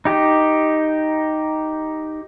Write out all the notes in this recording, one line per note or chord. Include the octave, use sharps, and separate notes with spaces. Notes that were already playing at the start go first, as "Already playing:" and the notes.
D#4 G4